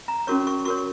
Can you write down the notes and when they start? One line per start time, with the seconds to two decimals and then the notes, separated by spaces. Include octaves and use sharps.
0.08 A#5
0.27 C#4 F#4 A#4 C#5 C#6
0.47 C#6
0.65 F#4 A#4 C#5 C#6